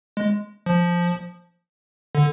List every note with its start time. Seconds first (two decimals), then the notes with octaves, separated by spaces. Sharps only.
0.17 G#3
0.66 F3
2.15 D3